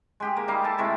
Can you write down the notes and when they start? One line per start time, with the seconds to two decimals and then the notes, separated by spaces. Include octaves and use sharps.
0.20 G#3 G4 G#4
0.36 A#3
0.48 G3 D#4 F5
0.64 A4 G#5 A5
0.78 C3 G#3 A3 E4